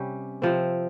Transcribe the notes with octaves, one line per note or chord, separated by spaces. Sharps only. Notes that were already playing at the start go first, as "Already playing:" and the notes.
Already playing: C3 G3 C#4 G4
C3 F3 C4